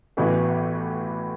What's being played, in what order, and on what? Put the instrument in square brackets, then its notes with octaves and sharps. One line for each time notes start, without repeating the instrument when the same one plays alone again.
[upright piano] A1 A2 E3 B3 F#4